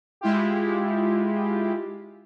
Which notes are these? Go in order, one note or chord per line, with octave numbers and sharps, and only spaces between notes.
G#3 E4 F4 G4